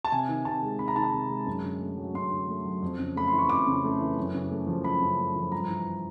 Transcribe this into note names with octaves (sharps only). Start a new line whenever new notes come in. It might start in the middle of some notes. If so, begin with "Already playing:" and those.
A5
C3 G#5
D#3
C3 A5
G#3
C3 B5
A#5
D#3 A5
A#5
C3
G#3
F#2
D3
A3
F#3
F#2 C6
D3
A3
F#3
F2
C#3
A3 B5
C6
E3
C#6
F2 D6
C#3
A3
E3
F#2
C#3
A3
F3
F#2 B5
C#3
A3
F3
G2 A#5
E3